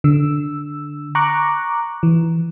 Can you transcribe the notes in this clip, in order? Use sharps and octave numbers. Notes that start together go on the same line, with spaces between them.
D3 E6
A#5 C#6 D6 F#6
E3